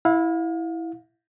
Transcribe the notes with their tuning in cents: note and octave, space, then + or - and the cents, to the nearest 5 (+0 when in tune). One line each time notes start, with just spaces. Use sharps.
E4 -5 F5 +35